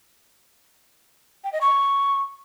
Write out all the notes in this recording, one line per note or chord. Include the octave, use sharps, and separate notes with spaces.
G5
D#5
C#6